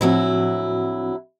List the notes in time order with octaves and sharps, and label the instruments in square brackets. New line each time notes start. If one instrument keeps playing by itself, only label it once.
[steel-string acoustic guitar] D2 F#3 E4 [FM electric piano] A2 F3 C4